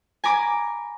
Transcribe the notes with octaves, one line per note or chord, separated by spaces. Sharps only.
G#5 A#5 B5 D6